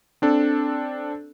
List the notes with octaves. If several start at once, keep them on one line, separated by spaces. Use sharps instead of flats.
C4 D4 A4